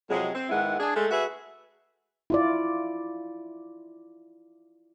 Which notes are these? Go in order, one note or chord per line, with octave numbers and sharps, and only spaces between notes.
F2 C3 F#3 G#3
C4
G#2 D#3 G#3 B3 E4 F#5
D4 G#4
G#3 A3 A4
F#4 G#4 B4 E5
E4 F4 D5